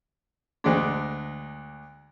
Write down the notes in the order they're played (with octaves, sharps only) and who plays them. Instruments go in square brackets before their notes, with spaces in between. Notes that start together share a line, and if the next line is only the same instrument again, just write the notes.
[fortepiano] D2 G#3 D4